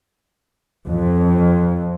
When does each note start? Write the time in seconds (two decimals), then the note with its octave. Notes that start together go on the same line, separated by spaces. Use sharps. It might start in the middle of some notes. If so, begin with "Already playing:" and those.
0.87 F2